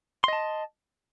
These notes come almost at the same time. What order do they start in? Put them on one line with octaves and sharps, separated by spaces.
C6 D#5 A5